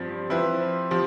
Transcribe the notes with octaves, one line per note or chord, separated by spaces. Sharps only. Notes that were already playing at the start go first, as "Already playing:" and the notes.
Already playing: G2 F3 C4
F3 C4 E4 B4
F3 C4 G4